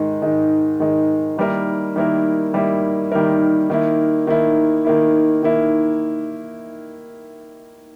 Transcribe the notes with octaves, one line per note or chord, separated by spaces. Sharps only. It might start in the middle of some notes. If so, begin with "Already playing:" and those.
Already playing: G#2 D#3 G#3
G#2 D#3 G#3
G#2 D#3 G#3
D#3 G3 A#3 E4 A#4
D#3 G3 A#3 E4 A#4
D#3 G3 A#3 E4 A#4
D#3 G3 A#3 E4 A#4
D#3 A#3 E4
D#3 A#3 E4
D#3 A#3 E4
D#3 A#3 E4